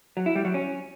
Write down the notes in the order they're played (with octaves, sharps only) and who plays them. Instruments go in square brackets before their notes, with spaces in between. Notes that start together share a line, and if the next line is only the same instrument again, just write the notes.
[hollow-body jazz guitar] F#3
E4
G3
F#3
C#4